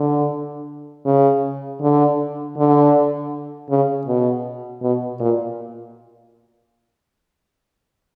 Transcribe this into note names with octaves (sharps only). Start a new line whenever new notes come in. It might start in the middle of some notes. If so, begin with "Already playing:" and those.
Already playing: D3
C#3
D3
D3
C#3
B2
B2
A#2